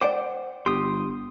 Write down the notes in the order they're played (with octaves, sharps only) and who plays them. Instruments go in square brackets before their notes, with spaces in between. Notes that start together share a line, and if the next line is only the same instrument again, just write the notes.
[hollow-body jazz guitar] C5 F#5 G5 [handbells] D5 D6
[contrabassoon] G1 [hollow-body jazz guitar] G4 [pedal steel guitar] C6 D#6